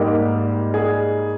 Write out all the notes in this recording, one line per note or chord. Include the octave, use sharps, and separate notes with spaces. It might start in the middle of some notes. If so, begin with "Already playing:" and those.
Already playing: G#2 G3 A#3 G4
G#4